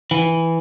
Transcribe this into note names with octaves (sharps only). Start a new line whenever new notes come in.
E3